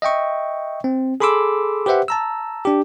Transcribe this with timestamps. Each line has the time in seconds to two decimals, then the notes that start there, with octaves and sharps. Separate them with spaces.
0.02 D#5 E5 G5 C#6
0.84 C4
1.20 G#4 A4 B5 C6 D6 E6
1.86 G4 B4 C5 E5 F#5
2.08 A5 A#5 E6
2.65 D4 G4